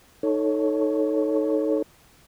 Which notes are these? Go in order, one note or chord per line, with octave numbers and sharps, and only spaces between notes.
D#4 A4 C#5